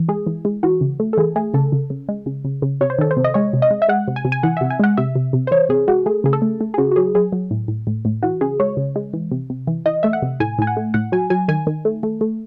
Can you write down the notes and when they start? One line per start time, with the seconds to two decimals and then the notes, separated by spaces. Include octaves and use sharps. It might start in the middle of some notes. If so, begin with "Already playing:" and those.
Already playing: E3
0.08 G#3 G#4
0.27 E3
0.45 G#3
0.63 E3 F#4
0.81 C#3
1.00 A3
1.13 A4
1.17 E3 G#4
1.36 A3 G#4
1.54 C#3 A4
1.72 C#3
1.90 C#3
2.09 G#3
2.26 C#3
2.45 C#3
2.62 C#3
2.81 C3 C#5
2.90 C5
2.99 D#3 A4
3.11 C5
3.17 C3
3.24 D#5
3.34 G#3 C#5
3.53 C3
3.62 D#5
3.71 G#3
3.82 E5
3.88 G#3 F#5
4.08 C3
4.16 G#5
4.25 C3
4.32 G#5
4.43 E3 F#5
4.57 C3 E5
4.70 G#5
4.80 G#3 F#5
4.97 C3 E5
5.15 C3
5.33 C3
5.47 C5
5.51 E3 C#5
5.69 C3 G#4
5.88 G#3 F#4
6.06 A3 G#4
6.24 C#3 G#4
6.33 A4
6.42 A3
6.61 A3
6.74 G#4
6.78 C#3 F#4
6.92 F#4
6.96 F#3 G#4
7.15 F#3 G#4
7.32 F#3
7.51 A2
7.68 A2
7.87 A2
8.05 A2
8.23 E3 F#4
8.41 C#3 G#4
8.60 G#3 C#5
8.77 C#3
8.96 G#3
9.13 E3
9.31 C3
9.50 C3
9.67 E3
9.86 E3 D#5
10.03 A3 E5
10.13 F#5
10.22 C3
10.40 A2 G#5
10.58 A2 G#5
10.67 F#5
10.77 A3
10.94 A2 F#5
11.12 F#3 G#5
11.30 F#3 G#5
11.48 D#3 G#5
11.67 D#3
11.85 A3
12.03 A3
12.21 A3